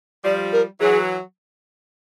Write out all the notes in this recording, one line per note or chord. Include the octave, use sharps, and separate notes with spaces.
F3 G3 D5
A#4
E3 F#3 G#4